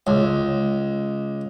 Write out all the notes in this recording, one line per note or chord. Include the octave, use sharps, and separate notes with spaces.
C#2